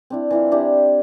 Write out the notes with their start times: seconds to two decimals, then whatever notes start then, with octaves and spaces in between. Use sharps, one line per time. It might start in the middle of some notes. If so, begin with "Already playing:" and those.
0.10 C4 D4 E4
0.30 E3 E4 F4
0.52 D4 E4 G4